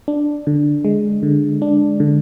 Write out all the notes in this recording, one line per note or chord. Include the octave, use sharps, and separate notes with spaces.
D4
D3
G#3
D3
D4
D3